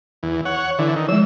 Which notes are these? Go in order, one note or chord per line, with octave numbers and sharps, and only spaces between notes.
E2
C#5 F#5
D3 E3
D#3
F3 G#3 E6